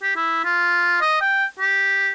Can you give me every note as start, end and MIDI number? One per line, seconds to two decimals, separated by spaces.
0.03 0.12 67
0.16 0.42 64
0.45 1.01 65
1.02 1.17 75
1.21 1.45 79
1.60 2.12 67